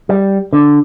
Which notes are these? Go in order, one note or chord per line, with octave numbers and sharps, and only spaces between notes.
G3
D3